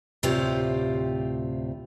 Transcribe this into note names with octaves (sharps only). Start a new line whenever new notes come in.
D2 A2 C3 F4 G4 C5